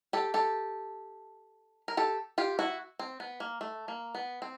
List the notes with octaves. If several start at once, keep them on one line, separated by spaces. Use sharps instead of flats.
G4 A4
G4 A4
A#4
G4 A4
F4 G4
E4 F#4
C4
B3
A#3
A3
A#3
B3
C4